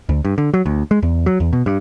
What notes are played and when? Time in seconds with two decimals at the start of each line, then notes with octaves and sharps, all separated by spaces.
0.09 D2
0.25 G2
0.38 D3
0.54 F#3
0.66 D2
0.91 G#3
1.03 E2
1.26 F#3
1.40 E2
1.53 B2
1.66 G2